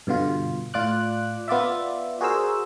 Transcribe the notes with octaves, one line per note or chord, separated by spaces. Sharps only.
G2 B2 D3 F4
A2 F4 D5 D6 F#6
B3 F4 D5 E5
F#4 G#4 A#4 C5 E6